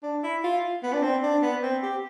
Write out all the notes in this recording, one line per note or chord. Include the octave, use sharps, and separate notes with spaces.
D4
E4
F4
B3
D4
C4
D4
B3
C4
G4